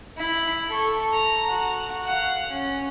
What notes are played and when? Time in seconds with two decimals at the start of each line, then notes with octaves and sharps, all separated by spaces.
0.18 E4 B5
0.68 A4 C#6
1.13 A#5
1.48 F#4
2.06 F5 F#5
2.49 C#4